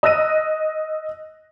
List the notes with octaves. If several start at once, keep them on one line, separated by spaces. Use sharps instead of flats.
D#5 E6 F#6 A#6 D#7